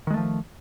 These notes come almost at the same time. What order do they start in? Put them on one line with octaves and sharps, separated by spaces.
D#3 G#3 A3 F3